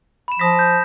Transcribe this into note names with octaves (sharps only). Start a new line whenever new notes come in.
B5 E7
F3 D#6 A#6 B6
G6